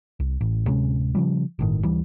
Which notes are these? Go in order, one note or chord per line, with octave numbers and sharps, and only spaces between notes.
C2
A1
D1 C3 G#3 C#4
C#3 F3 G3
G1 A2 D#3
D2 E3 G3